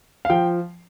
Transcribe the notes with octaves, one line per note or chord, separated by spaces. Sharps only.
F5
F3 G5